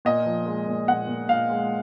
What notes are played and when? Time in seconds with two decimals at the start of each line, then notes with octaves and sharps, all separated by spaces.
0.05 A#2 D#5
0.26 F3
0.46 G#3
0.67 A#2
0.88 A#2 F#5
1.08 A#2
1.28 A#2 F5
1.50 G#3